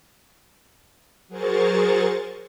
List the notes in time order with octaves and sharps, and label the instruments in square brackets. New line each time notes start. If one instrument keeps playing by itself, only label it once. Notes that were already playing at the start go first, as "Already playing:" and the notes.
[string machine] F#3 G#4 A#4 C5 C#6 A6